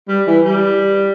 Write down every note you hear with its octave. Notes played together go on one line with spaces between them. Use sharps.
G3
E3
G3